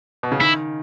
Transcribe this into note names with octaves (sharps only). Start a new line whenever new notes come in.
B2
C#3
D#3 E4